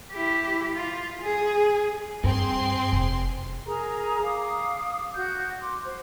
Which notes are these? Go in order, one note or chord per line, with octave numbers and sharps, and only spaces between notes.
E4 G4
F4
G#4
G2 C4 G#4 C6
F1
G#4 A#4 A#5
F5 D6 D#6
F#4 G6
C6 D6
C5